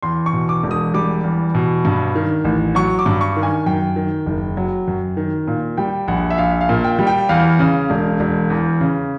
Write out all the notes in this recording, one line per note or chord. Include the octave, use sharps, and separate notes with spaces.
E2 C6
C#6
B2
D6
E1
D#6
G3 D6
E2
B2
G2
D#3
A1
F#3 C#6
D6
G2
C#6
D#3
G#5
F#2 G5
D#3
F#1
F#3
F#2
D#3
A#2
G3 G5
A#1 F#5
E5
A#1 F5
F5
A#2
G5
G3
G5
E2 F5
C#3
E1
E1
E2
C#3